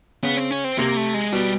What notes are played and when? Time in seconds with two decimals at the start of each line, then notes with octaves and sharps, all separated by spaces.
0.23 C#3 B3
0.37 C4
0.51 C#4
0.64 C4
0.78 C3 A#3
0.97 A3
1.14 G#3
1.32 B2 G3